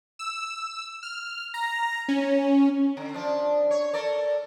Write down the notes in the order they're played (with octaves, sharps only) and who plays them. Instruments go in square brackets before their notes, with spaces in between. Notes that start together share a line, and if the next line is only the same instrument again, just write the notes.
[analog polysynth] E6
F6
A#5
C#4
[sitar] D3
F3 D4
C#5
A4 A#4 D5